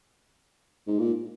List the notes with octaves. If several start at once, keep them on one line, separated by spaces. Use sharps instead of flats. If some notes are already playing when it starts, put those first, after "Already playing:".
G#2
A#2